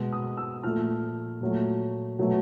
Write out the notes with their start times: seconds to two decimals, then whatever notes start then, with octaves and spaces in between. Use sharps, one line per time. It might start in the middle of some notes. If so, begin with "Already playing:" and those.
Already playing: B2 G#3
0.12 D#6
0.37 E6
0.63 A#2 F3 A3 F6
1.41 A#2 F#3 A3
2.19 B2 F#3 A3